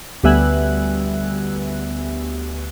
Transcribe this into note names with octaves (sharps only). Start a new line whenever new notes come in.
D2 G3 B3 E5 G#5 F#6